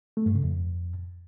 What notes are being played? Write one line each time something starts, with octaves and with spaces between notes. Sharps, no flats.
A3
G2
C#3
F2